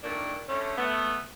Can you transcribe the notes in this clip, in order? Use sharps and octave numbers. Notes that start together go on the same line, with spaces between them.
A#2 D#3 G3 A3 A#3 D4
D3 A3 C#4
A3 B3